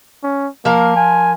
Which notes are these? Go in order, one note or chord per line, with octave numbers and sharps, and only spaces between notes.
C#4
F3 A#3 A#4
G#5